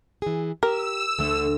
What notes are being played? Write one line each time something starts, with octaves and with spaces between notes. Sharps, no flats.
E3 G#4
G4 A#4 E6
D2 D3 A3